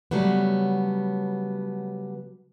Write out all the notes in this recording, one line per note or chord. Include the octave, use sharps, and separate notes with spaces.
C#3 F#3 G3 A3 B3